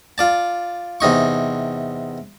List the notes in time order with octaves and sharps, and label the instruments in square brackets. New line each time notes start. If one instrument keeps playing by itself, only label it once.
[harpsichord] F4 D5 A5
E2 C3 D#4 C#6